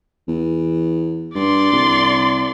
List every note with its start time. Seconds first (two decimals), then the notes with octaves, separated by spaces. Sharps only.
0.28 E2
1.35 G2 D5 C6
1.73 C2